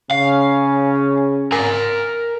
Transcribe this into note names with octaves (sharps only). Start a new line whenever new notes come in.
C#3 C#4 F5
A#4 G#5